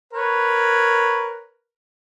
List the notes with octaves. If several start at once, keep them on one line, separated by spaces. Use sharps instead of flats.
A#4 B4 C#5